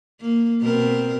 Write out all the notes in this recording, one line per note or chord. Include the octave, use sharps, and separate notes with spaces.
A#3
B2 C4 A#4